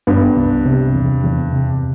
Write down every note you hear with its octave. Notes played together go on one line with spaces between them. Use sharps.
G2 B3
C2
C3
E2
E2
C3